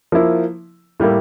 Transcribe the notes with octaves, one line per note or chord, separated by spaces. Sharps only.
F3 A#3 E4
A2 G3 A#3 E4